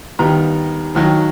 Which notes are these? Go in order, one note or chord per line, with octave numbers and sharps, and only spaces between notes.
D#2 D#3 G3 B3 A#5
D#2 D#3 F#3